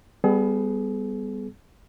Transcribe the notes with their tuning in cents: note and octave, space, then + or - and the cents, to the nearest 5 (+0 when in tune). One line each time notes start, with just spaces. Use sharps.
G3 +20 B3 +20 G#4 +45